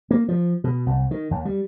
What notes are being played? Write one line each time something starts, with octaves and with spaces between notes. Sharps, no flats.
A#3
F3
B2
C2
D#3
D#2
G3